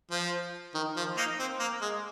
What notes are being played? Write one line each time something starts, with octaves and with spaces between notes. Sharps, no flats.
F3
D#3
F3
A#3 D#4
C4
A#3
G#3